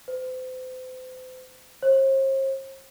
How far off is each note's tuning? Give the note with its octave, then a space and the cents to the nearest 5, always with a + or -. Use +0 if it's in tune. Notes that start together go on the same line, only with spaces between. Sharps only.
C5 -40
C5 +45